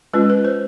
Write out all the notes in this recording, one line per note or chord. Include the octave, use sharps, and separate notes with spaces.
G#3 C#4 F4 B4
B4
C5